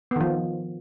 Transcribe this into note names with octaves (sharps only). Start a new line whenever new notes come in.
D#3 F3 B3